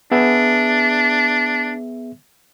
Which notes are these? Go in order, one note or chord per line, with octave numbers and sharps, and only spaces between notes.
B3 D4 G#4 E5